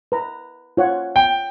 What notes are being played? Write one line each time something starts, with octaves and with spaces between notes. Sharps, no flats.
B4 A#5
F4 C#5 F#5
G5